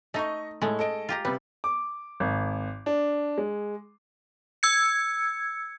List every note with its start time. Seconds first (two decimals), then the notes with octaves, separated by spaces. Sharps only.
0.14 A3 D#4 D#5 C#6
0.62 A2 G#3 A3
0.79 A4 D#5 D7
1.09 F4 G4 A#5
1.25 C3 G3 B4
1.64 D6
2.20 G#1
2.86 D4
3.38 G#3
4.63 E6 G#6 C#7